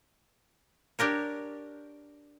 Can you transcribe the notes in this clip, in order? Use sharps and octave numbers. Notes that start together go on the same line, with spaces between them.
D4 G4 A#4 C#5